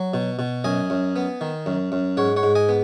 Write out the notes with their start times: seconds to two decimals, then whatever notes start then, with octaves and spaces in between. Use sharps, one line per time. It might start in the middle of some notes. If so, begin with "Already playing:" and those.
Already playing: F#3
0.14 B2
0.39 B2
0.64 F#2 D#5 G#5
0.90 F#2
1.16 B3
1.41 D#3
1.66 F#2
1.92 F#2
2.17 G#2 C#5 F#5
2.36 C#5 F#5
2.43 G#2
2.55 D#5 G#5
2.69 B3